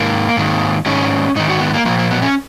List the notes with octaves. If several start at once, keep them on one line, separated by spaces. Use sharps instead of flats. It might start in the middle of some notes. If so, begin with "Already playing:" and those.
Already playing: G#2 D#3 A#3
G#2 D#3
G#2 D#3 C#4
G#2 D#3 D#4
F#4
B3
A#3
A#2 F3 A#3
A#3
B3
C#4